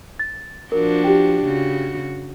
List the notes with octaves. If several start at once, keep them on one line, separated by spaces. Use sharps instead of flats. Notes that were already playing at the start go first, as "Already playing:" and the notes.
A6
F3 D4 F#4 A#4
G4 G5
C#3 F#4